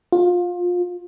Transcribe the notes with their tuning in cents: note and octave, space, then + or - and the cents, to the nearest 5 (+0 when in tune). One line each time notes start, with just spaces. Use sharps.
F4 +25